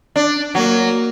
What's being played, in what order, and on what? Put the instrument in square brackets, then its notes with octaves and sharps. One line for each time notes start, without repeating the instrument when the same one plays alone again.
[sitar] D4
[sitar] F#3 [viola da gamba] A#3